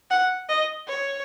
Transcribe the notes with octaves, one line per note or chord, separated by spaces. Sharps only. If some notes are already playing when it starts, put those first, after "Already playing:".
F#5
D#5
C#5